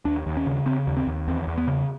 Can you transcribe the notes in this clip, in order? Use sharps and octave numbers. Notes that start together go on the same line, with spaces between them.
D#2 D4
D#2
C#4
C#3
C#3 C4
D#2
C4
D#2
E2 C4
E2
B3
C#3